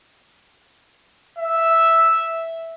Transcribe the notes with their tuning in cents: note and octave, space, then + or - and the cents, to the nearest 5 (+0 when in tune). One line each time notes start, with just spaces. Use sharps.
E5 -5